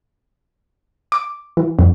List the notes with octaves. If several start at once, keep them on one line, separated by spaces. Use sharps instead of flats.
D6
E3
F2